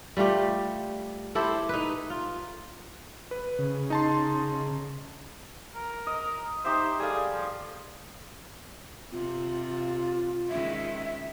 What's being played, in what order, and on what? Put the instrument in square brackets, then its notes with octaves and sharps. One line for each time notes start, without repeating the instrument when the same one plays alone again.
[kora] G3 A3 F4 G4
E4 G4 A4 C5
D#4 B4
F4
[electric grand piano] B4
[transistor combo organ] C#3
[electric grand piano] D#4 A5 C6
[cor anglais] A#4
[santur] D#5
[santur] D#4 G4 E5 [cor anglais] C5
[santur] G3 A4 F5 [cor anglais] G#4
[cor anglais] F3
[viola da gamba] C3 [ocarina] F4
[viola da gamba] D#3 G#3 C#4 [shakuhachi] E5